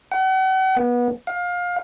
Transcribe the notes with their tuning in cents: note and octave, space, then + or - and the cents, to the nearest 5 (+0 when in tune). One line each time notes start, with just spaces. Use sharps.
F#5 +40
B3 -25
F5 +25